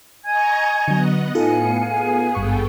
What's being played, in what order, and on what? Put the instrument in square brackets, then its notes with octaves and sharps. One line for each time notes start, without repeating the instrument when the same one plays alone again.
[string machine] D#5 A#5 C#6 [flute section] G#5 G#6
[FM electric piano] D3 F#3 [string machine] B3 D#5 F#5
[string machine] A2 B3 C#7 [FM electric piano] D#4 F4 A4 [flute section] F5 G#5
[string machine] B3 G#4
[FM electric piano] G#1 G2 C#6 [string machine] B3 A4 G5